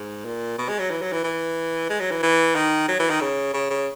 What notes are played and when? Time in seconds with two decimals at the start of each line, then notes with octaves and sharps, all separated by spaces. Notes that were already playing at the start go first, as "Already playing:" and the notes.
Already playing: G#2
0.25 A#2
0.58 B2
0.68 G#3
0.79 F#3
0.90 E3
1.01 F#3
1.12 E3
1.24 E3
1.89 G#3
2.00 F#3
2.11 E3
2.22 E3
2.55 D#3
2.88 F#3
2.99 E3
3.10 D#3
3.21 C#3
3.53 C#3
3.70 C#3